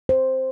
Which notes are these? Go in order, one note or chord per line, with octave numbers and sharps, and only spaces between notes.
C5